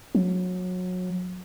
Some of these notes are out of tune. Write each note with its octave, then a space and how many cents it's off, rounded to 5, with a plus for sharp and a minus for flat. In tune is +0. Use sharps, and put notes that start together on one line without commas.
F#3 -25